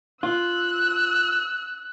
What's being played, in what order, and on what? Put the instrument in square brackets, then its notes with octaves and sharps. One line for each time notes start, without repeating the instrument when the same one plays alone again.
[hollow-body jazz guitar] F4 [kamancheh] E6 F#6